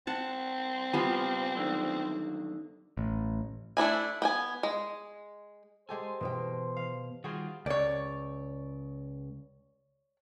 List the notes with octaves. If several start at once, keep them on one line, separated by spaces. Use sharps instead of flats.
C4 F#5 A5
C#2 G3 B3 F4 G#5
F#2 D3 D#3
A1
A3 D4 E4 G#5
B3 G5 G#5
G#3
G#3 G4 A4 C5 G#5
B2 E3 C#5 G5
F5
D#3 G3 F4 F#4 G#4 C5
C#2 C#5 D5